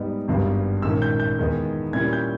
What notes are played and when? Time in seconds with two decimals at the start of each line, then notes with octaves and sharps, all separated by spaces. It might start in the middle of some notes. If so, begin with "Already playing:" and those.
Already playing: G#2 G3 B3 D#4
0.28 G#1 G2 G3 B3
0.82 A#1 G#2 D#3 A#3 C#4 E6
1.02 G6
1.20 G6
1.39 E2 D#3 G#3 B3 D#4
1.93 A#2 G3 C#4 E4 G#6
2.13 G6